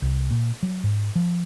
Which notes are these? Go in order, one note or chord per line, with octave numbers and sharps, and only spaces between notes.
C2
A#2
F#3
G#2
F3